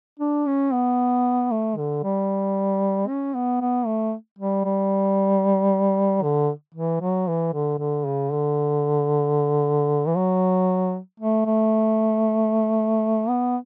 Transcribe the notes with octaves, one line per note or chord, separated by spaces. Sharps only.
D4
C#4
B3
A3
D3
G3
C#4
B3
B3
A3
G3
G3
D3
E3
F#3
E3
D3
D3
C#3
D3
E3
F#3
A3
A3
B3